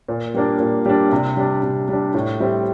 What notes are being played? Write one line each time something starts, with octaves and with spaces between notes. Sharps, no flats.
A#2
G3 A#3 D4
A#2
G3 A#3 D4
C3
G3 D4
C3
G3 D4
A2
G3 C4 E4